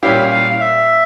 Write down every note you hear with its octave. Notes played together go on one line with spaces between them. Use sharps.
A#2 G3 C#4 E4 G4 F5
F5
F5
E5